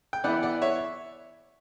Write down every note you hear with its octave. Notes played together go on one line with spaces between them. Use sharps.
G5
E3 B3 E4 D5 F#5
D5 F#5
C#5 E5